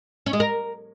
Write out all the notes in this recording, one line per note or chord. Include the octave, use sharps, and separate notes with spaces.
C#4
G#3
A#4